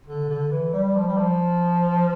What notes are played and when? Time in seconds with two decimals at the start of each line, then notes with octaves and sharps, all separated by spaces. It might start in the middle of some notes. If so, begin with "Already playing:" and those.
0.06 D3
0.29 D3
0.51 E3
0.73 G3
0.96 F3
1.07 G3
1.18 F3